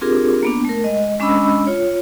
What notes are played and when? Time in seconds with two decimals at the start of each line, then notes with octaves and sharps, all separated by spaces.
0.01 C4 D4 F4 G4 G#4 A#4
0.43 A#3 B3 D4
0.65 A3 A#4
0.84 G#3 D#5
1.20 G#3 C#4 D4 D#5 B5 E6
1.67 F4 C#5